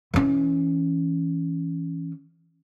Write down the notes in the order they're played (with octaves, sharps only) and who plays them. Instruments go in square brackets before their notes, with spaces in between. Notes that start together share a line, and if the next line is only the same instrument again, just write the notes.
[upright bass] E3 C#4